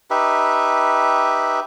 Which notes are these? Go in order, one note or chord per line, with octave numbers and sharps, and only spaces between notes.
D#4 G4 B4 E5